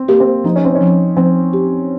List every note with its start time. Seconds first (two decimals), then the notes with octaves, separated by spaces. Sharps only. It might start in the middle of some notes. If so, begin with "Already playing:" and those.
Already playing: C4
0.08 A#3 G4
0.20 C4
0.44 F3 D#4
0.56 C#4
0.65 C4
0.75 C#4
0.81 F3
1.17 F3 C4
1.53 G4